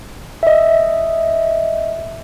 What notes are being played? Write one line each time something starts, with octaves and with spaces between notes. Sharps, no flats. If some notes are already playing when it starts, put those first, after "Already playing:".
D#5 E5